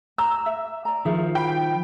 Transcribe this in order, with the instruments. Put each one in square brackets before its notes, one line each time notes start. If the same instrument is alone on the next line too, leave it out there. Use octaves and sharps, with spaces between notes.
[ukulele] A#5 [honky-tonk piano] E6
[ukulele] E5
D5 A#5
[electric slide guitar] D#3 F3 [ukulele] G#4 E5
[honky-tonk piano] G5 B5